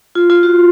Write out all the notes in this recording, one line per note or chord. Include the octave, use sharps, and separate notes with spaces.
F4
F4
F#4